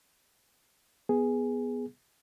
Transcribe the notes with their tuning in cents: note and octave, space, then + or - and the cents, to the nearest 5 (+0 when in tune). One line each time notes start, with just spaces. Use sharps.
B3 +0 G#4 +0